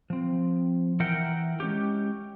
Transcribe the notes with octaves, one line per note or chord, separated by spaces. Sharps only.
F3 C4
E3 A#4 E5 F#5 G5
G#3 C#4 G4